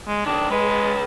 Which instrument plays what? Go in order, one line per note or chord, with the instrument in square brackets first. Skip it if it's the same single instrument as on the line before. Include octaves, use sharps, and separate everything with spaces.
[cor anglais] G#3
[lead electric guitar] B1 D#3 [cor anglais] D4
[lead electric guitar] C#2 B4 [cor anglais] G#3